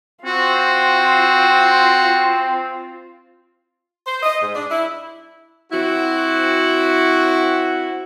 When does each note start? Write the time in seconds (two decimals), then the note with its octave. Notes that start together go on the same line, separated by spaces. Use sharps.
0.25 C4 F4 F#4
4.06 C5
4.23 D#5
4.42 G#2
4.54 D4
4.71 E4
5.72 C4 E4 F#4